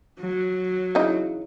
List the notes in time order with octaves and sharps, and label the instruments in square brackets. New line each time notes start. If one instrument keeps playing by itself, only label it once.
[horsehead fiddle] F#3
[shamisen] C#3 E3 D#4